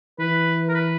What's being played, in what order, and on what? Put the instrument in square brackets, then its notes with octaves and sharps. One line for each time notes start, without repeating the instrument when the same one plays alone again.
[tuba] E3 [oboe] B4
[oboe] A#4
B4